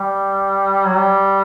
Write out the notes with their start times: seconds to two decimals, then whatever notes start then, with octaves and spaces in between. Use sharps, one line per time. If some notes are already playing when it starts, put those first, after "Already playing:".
Already playing: G3
0.85 F#3
0.97 G3